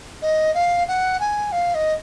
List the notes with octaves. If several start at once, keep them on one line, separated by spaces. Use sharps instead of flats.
D#5
F5
F#5
G#5
F5
D#5